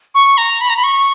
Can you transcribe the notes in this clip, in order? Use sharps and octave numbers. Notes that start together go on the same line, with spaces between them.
C#6
A#5
B5
A#5
B5
C#6